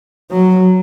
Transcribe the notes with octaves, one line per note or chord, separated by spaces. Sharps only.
F#3